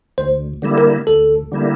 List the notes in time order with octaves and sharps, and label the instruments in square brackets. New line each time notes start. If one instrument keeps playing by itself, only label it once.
[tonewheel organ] D2 [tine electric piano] C5
[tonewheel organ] D3 G3 A#3 E4
[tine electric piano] A#4
[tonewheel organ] D2 [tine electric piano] A4
[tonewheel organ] D3 G3 A#3 E4